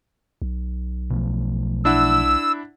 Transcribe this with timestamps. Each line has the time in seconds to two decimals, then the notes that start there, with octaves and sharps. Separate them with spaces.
0.42 B1
1.10 B2 F3 A3
1.85 D4 E4 F#5 E6